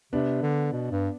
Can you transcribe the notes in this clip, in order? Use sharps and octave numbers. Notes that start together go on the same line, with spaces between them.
C3 B3 D4
D3
B2
G2